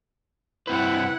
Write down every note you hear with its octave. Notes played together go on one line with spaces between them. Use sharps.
G2 C4 E4 B4 F#5